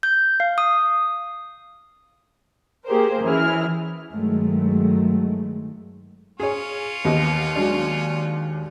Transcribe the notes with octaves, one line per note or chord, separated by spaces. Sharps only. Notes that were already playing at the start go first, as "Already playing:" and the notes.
G6
F5
D#6
A#3 G4 G#4 A#4 C5
F#2 E3 E4 G#4 F6
G2 D#3 F#3 G#3 A3
C#4 F4 G#4 C#5
D#2 B3 G4 D#5
F#3 G#3 D4